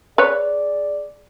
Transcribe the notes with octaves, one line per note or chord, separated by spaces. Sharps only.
G#4 B4 C#5 D5